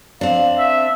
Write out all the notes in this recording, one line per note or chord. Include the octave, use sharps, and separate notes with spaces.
C4 D4 F5
E5